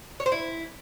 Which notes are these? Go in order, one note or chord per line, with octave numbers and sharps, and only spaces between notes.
C#5
C5
E4